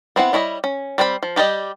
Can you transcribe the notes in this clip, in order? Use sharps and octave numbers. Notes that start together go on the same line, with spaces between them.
B3 C4 E4 F#5
G3 E4 C#5 D#5
C#4
G3 C4 D4 B5
F3
G3 G4 D5 D#5